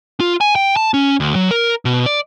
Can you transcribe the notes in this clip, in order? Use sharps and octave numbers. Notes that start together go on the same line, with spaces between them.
F4
G#5
G5
A5
C#4
D2
F#3
A#4
B2
D5